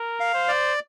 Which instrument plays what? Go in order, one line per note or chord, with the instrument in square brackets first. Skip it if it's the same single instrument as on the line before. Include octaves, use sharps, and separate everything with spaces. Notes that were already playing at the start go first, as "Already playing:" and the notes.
Already playing: [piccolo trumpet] A#4
[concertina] F5
[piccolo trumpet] C5
[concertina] D5